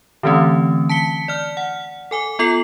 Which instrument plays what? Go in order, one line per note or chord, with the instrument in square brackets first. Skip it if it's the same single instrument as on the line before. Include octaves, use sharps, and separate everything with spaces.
[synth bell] D3 E3 A3 C4 C#4
A5 B6 C#7 G7
D5 F6
F#5
A4 G#5 D6
B3 F4 A4 C7 F#7